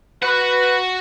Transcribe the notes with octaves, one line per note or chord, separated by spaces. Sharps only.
F#4 B4 F#5